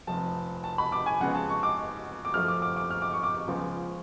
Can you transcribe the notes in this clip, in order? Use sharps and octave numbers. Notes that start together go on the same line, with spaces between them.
F1 F2 F3 A5
A5
B5
D6
G#5
F2 C#3 G#3 B3 F#5
A5
C#6
D6
D6
F#2 F3 A3 F6
D6
D6
D6
F6
D6
C#6
D6
C#2 C#3 F3 G#3 B3